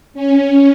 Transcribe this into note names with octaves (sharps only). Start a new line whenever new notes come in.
C#4